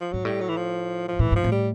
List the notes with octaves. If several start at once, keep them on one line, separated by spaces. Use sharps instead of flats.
F3
G#2 F#3
A2 G3
F#3
E3
F3
F3
A2 E3
G#2 F3
A2
G3